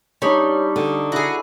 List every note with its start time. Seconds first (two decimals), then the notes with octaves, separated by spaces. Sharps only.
0.22 G3 D4 D#4 C#5 C#6
0.76 D3
1.12 E4 F#4 G#4